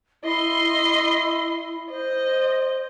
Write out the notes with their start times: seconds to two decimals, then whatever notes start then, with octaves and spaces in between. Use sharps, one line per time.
0.24 E4 D#5 C6
1.91 C5 D#5